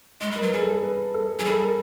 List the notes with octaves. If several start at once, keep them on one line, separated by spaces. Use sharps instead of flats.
G#3 D#5
G3 A#4
F#3 B4
G3 G#4
A4
B4
A4
F#3 G#4
G3 A4
A#4